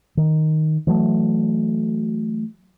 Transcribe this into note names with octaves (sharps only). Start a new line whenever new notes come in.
D#3
E3 F#3 A3